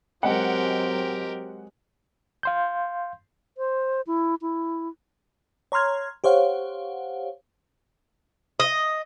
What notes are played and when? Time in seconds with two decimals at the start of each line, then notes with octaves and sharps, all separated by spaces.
0.23 F#3 G#3 C4 G4 A#4 F#5
2.43 F5 C6 G6
3.58 C5
4.07 E4
4.42 E4
5.72 C#5 A#5 C6 F6 G#6
6.24 G4 C5 C#5 F5 F#5
8.60 D#5